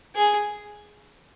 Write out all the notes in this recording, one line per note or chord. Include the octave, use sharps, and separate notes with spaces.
G#4